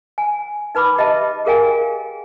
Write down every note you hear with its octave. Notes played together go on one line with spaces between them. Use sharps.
G#5
D#4 B4 B5 D6 D#6
G4 D#5 E5 A5
G4 G#4 A#4 F5 G5 G#5